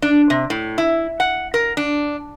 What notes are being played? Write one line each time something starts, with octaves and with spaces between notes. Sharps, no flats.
D4
C3
A2
E4
F#5
A#4
D4